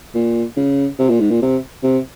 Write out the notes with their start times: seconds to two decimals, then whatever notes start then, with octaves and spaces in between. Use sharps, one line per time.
0.14 A#2
0.57 C#3
0.99 C3
1.10 A#2
1.20 G#2
1.30 A#2
1.42 C3
1.83 C3